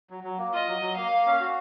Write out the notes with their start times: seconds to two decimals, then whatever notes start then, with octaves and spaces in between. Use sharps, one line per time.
0.10 F#3
0.24 F#3
0.38 A#3
0.53 F4 D#5
0.68 F#3
0.82 F#3
0.96 A#3 F5
1.12 A#3
1.26 C#4
1.40 F#4